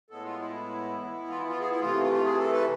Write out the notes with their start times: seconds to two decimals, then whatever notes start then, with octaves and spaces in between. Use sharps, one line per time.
0.10 A2 G#3 B3 A4
0.25 F4
0.39 E4
0.96 E3 B3
1.28 F4
1.39 E4
1.49 F4
1.60 G#4
1.70 E4
1.81 C3 E3 A3 F4
2.03 F4
2.13 F4
2.24 G#4
2.38 A4
2.52 B4